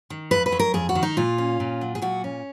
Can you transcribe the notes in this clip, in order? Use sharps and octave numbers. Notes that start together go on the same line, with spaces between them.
D#3
F2 B4
B4
F#3
A#4
F2 G#4
F#4
D#3
D#4
A#2 F4
C#4
A#2
F#3
G#4
A#2 F#4
C#4